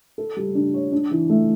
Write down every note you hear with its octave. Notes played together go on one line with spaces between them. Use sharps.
A4
G3
D4
C#5
D4
E3
A3